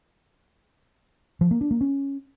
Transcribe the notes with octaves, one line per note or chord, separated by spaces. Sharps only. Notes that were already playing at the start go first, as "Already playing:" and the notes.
F3
A#3
D4
A#3
C#4